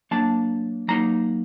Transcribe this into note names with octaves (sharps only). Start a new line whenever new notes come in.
F#3 A#3 D4 A5
F#3 A#3 D#4 A#5